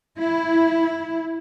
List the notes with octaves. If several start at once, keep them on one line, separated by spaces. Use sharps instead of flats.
E4